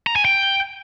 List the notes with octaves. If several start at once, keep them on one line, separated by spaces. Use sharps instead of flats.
A#5
G#5
G5